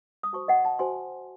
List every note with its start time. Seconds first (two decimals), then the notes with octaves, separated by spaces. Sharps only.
0.23 D#6
0.33 F#4 C5 A5 C#6
0.48 D#5 F#5
0.65 F#5 A5
0.79 F#4 C5 G#5 C6